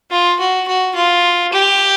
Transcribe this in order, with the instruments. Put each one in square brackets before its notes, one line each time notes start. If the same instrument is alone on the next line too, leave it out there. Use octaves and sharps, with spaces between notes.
[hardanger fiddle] F4
F#4
F#4
F4
G4